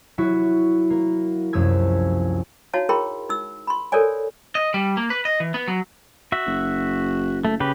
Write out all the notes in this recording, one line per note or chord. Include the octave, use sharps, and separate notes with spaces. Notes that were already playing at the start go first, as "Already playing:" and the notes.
F#3 E4 F#4
A#3
C2 F#2 F3 A3 E6 G#6
D#4 E4 F#4 C#5 F5 A5
E4 G#4 A#4 G5 B5 C6
D#4 E6
B5 C6
A4 A#4 C#5 D5 G#5
D#5
G3
A#3
B4
D#5
E3
B3
F#3
F#4 E5
F#1
A3
C#3 G4 B4